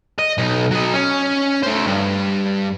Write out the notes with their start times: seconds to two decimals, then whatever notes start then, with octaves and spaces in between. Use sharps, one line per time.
0.19 D#5
0.38 B1 D#4
0.71 F#3 D#5
0.93 C#4
1.63 A3 C5
1.87 G2